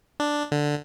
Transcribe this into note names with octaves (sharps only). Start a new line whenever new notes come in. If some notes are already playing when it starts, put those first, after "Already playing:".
D4
D3